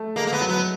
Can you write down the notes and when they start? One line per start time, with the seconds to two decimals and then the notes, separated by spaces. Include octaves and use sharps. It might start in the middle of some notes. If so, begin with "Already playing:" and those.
Already playing: A3
0.16 G#3 A#3
0.27 A#3
0.33 B3
0.41 F#3
0.49 B3